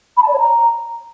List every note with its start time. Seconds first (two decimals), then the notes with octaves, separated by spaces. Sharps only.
0.17 B5
0.23 A5
0.28 D5
0.34 C#5
0.39 A#5